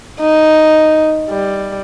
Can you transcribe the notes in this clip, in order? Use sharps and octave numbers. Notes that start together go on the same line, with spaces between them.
D#4
G3